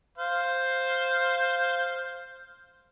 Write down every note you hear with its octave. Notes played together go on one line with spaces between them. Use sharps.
C5 F5